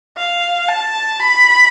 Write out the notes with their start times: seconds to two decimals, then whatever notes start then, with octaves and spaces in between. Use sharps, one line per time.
0.17 F5
0.68 A5
1.20 B5